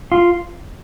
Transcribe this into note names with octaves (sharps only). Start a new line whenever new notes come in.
F4